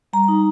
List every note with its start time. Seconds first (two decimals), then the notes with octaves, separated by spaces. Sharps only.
0.13 G3 A#5
0.28 D#4